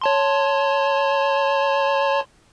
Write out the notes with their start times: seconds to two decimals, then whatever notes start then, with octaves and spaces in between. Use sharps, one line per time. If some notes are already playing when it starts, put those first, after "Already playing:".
0.01 C#5 A5 C6